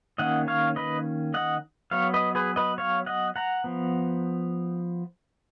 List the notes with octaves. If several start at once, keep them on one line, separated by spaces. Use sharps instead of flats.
D#3 A#3 C#4 D#5 F#5
C#5 F5
B4 D#5
D#5 F#5
F#3 B3 C#5 F5
B4 D#5
G#4 B4
B4 D#5
C#5 F5
D#5 F#5
F#5 A#5
F3 B3